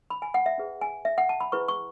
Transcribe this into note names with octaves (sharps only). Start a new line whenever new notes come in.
B5
G#5
F#5
E5
C#4 G#4 B4
G#5
E5
F#5
A5
B5
E4 G#4 B4 C#6
C#6